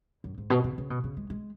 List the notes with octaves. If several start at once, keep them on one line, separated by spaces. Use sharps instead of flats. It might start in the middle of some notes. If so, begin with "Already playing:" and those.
F#2
G#2
B2
C#3
C#3
B2
C#3
G#3
G#3